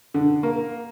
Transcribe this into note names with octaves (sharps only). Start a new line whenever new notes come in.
D3
A#3